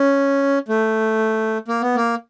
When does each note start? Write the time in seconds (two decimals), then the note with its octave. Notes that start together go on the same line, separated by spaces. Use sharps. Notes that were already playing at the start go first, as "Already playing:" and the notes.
Already playing: C#4
0.68 A3
1.68 A#3
1.82 B3
1.95 A#3